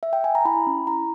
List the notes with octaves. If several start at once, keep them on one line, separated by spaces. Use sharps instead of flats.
E5
G5
G#5
A#5
E4 B5
C#4
E4 A#5